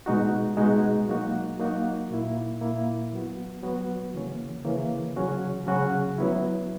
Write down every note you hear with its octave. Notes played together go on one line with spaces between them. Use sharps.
B2 G#3 D#4 F#4
B2 G#3 D#4 F#4
F#3 A#3 D#4 F#4
F#3 A#3 D#4 F#4
A#2 A#3 E4
A#2 A#3 E4
F#3 B3 F#4
F#3 B3 F#4
C#3 E3 A#3 C#4
C#3 E3 A#3 C#4
C#3 F#3 C#4 F#4
C#3 F#3 C#4 F#4
F#3 B3 E4